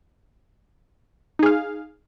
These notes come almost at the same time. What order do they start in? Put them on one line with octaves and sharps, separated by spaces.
D#4 G#4 F5